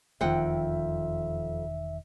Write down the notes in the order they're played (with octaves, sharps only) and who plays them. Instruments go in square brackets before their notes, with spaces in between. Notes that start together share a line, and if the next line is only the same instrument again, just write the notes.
[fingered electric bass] E1 D#3 [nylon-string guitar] F2 F#5 G5 [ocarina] E5